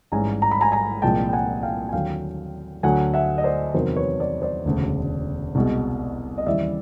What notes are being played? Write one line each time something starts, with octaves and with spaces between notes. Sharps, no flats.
A1 G#2 E3 G3 G#5 A#5
A#5
B5
G#5 A#5
G#5 A#5
C2 A#2 F3 G#3 G5 A5
G5
F#5 G#5
F5 G5
G#5
D#2 D3 F#3 F5 G5
D2 D3 F#3 F#5 G#5
E5 F#5
D#5
C5 D5
E2 C3 D#3 F#3 A#4 C5
B4 C#5
C5 D5
C5 D5
E1 D2 C#3
C2 B2 G#3
D#5
D#2 C#3 E3 G3 D5 E5